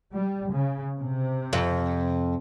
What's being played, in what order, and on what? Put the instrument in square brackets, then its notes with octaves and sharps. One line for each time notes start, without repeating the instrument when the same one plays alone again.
[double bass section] G3
C#3
C3
[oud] F2